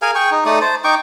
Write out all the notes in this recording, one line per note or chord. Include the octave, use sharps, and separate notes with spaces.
G#4 A#4 F5 G#5
G#4 G5 C#6
D#4
A3 D#4 D5 D#6
C5 A5
D#4 G5 C#6 D6